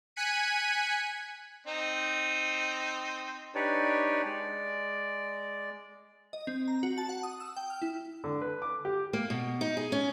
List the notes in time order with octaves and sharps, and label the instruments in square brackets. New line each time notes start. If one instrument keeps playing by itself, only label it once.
[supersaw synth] G#5 F#6 G#6 B6 C#7 D#7
[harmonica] C4 D#4
[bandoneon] D4 D#4 G4 B4 C#5 D5
G#3 D5
[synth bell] D#5
C4
A#5
F#4
A5
F#5
D#6
E6
G5
F6
E4
[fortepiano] D3
B4
D6
G4
[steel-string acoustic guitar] A#3
B2
D#4
G#4
C#4